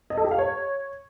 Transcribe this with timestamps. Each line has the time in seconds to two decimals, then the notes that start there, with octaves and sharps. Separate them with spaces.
0.10 D#5
0.17 A4
0.24 G4
0.31 F5
0.38 C#5